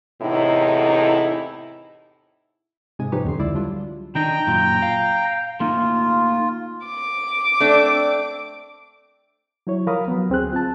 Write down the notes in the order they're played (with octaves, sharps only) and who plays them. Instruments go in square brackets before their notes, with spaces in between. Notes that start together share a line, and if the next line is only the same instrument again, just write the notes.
[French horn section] E2 A2 C3 D#4 E4
[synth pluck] G#2 C3 G#3 G#5 D#6
F3 G#3 D#4 G4 B4 C#5
E2 D3 C6
C#2 E4 D5 D6 E6
F#3 G3 D4 F4 E5
[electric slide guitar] D#3 D4 D#4 [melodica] G5 A#5
[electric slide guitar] F#2 A#2 F4
F5
[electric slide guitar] A3 A#3 D#4 [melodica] F4
[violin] D6
[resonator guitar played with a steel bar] A3 C4 D4
[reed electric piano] F#3 E4 C#5
F3 A#4 F5 A#5 B5 D#6
F#3 B3
D2 C4 G#4 F#6
F4 A5